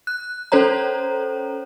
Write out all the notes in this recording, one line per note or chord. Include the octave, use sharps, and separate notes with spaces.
F#6
C#4 A4 C5 C#5 A#5